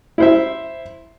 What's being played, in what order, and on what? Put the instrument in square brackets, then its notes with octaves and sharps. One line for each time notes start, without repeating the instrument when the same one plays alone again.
[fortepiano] E4 C5 E5